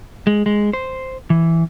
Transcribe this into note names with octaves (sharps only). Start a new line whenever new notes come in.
G#3
G#3
C5
E3